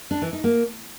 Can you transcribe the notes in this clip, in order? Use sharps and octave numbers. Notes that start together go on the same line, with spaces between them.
D4
E3
D#4
A#3